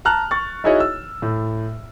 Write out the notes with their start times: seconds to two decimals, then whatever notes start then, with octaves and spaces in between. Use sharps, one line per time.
0.05 A5 A#5 F6 F#6
0.31 C#6 A6
0.64 D#4 E4 F#4 G#4 C#5 D#5
0.80 E6
1.22 A2